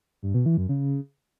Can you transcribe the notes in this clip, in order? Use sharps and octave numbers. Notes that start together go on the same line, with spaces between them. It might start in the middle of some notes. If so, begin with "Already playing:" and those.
G2
B2
E3
F#2
C#3